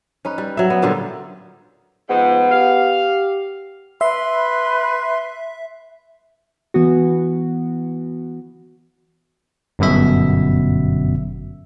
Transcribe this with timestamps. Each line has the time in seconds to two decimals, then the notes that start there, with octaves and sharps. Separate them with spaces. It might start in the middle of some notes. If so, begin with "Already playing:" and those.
0.25 C#4 D#4 B4
0.38 G3
0.57 F#3 E5
0.70 B3
0.82 A#2 D3 G3 F4
2.10 G#2 F3 B3
2.51 G4 F5
4.01 B4 E5 C6
6.74 E3 B3 F#4
9.79 G1 F#2 B2 E5